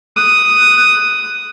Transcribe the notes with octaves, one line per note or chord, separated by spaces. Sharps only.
D#6 F#6